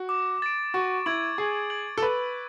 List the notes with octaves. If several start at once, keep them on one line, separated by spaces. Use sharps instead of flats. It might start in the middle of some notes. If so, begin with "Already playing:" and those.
Already playing: F#4
D6
A6 D7
F#4 C#6
E4 G#6 D7 F#7
G#4 C#6
G#6 D7 F#7
A4
B4 E6